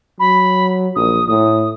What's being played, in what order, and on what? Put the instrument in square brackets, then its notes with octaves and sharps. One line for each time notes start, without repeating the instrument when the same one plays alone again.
[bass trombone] F#3 [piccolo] B5
[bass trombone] A#1 [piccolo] D#6
[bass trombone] A2 [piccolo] D#6